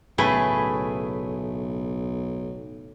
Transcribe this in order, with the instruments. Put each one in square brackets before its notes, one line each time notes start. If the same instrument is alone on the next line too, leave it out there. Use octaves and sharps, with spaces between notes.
[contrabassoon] B1 [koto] A2 C#3 A3 [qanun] G#4 [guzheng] B4